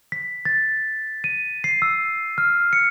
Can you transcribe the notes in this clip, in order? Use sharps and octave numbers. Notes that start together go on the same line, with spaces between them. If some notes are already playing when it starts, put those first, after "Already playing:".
B6
A6
D#7
C7
E6
F6
C#7